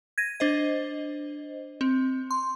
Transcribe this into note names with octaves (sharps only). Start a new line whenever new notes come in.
G#6 A#6 D#7
D4 C5 D#5
C4
C6